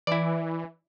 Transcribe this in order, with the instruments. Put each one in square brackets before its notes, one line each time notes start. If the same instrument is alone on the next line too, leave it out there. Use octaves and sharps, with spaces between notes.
[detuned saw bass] E3 [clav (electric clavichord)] E4 D5